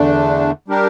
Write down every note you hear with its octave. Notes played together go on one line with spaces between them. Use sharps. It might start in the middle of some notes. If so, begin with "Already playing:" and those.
Already playing: E2 D3 A3 D4
G3 D4 G4 A#4